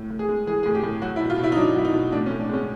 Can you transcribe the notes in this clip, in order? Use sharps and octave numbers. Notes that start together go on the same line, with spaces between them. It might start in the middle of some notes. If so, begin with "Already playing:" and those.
Already playing: A2
A2
G#4
G#3
E3 G#4
A2 G#4
G4
A2
F#3 F#4
E4
B2
F4
B2
E4
D#4
F#3 D4
F#3 E4
D#4
B2
A2 D4
C#4
A2
D4
G#3 C#4